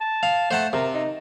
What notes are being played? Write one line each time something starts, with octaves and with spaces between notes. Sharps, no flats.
A5
F5
A3 C5 F#5 A5
C3 A#4
D#4